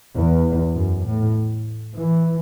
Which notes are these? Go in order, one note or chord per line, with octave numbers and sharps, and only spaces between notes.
E2
F#2
A2
E3